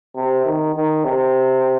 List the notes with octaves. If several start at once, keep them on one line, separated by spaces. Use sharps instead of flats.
C3
D#3
D#3
C3